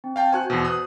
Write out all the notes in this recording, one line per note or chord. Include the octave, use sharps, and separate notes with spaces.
C4
F5 G5 A5
F#4 C5 G#5 C#6 F#6
E2 B2
D#6 F#6